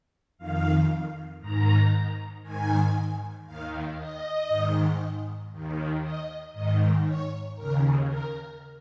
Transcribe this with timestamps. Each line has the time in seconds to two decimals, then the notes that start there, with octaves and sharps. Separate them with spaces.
0.38 F2 D#3 F5
1.40 G#2 D#3 A#5
2.43 G#2 D#3 G#5
3.45 D#2 D#3 F5
3.97 D#5
4.48 G#2 D#3
5.52 D#2 D#3
6.03 D#5
6.54 G#2 D#3 D#5
7.06 C#5
7.56 D#2 C#3 A#4
8.08 A#4